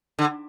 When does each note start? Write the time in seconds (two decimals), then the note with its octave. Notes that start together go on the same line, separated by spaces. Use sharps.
0.19 D3